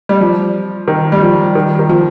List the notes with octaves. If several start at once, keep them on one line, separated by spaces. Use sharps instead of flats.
G3
F3
D#3
G3
F3
D#3
D#3
F3